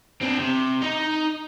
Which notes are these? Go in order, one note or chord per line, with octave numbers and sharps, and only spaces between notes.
C4 D4
C3
D#4 D#5